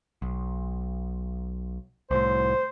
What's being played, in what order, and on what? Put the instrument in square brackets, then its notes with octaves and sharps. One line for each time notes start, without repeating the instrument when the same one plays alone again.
[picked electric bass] B1
[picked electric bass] C2 A2 [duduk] C5